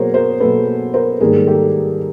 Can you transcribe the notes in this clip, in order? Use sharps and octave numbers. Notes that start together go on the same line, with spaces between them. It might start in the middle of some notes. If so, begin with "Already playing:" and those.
Already playing: B2 F#3 A#3 G#4 A#4 C5 C#5
A#4 C5
B2 F#3 A#3 A4 B4
A#4 C5
G#2 D#3 G3 A#3 G#4 A#4
G4 A4